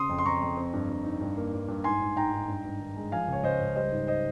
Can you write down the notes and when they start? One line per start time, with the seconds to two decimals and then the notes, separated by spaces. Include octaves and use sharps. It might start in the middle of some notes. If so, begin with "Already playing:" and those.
Already playing: C#3 C6 D#6
0.09 F2
0.18 C6
0.25 F2 A#5 C#6
0.42 F2
0.57 C4
0.73 G2
0.89 G2
1.04 D#4
1.21 G2
1.37 A#3
1.53 G2
1.68 G2
1.84 G#2 G#5 C6
2.01 G#2
2.16 G#2 G5 A#5
2.33 G#2
2.48 G2
2.65 G2
2.80 D#3
2.96 G#3
3.12 F3 F5 G#5
3.28 C#2 C#5
3.44 C#2 C5 D#5
3.61 C#2
3.76 G3 C5 D#5
3.92 G#2
4.07 C5 D#5